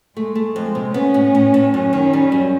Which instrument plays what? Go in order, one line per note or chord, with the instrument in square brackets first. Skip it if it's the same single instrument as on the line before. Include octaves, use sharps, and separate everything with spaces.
[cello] G#3 [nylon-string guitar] A3
[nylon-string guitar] A3
[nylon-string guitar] F2 [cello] G#3
[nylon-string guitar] C3
[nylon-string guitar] B3 [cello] C#4
[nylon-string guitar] A2
A2
A2
[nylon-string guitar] F#2 [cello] C#4
[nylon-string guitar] D#3
G3
F#2